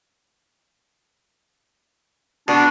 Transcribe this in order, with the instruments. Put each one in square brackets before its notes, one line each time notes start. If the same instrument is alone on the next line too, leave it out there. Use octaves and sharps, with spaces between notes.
[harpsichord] B2 [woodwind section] D4